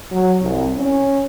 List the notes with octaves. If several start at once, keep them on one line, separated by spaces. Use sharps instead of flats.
F#3
C2
C#4